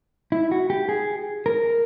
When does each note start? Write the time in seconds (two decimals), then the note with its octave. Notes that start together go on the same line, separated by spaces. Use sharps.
0.32 E4
0.51 F#4
0.70 G4
0.89 G#4
1.46 A#4